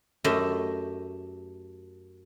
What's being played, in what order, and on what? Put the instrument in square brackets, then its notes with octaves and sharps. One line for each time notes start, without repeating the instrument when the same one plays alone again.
[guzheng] F#2 A3 G4 D#5 E5